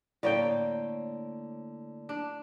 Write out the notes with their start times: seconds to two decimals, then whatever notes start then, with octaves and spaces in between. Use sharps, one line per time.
0.23 A2 D3 A#3 C#5 D5 G5
2.09 D4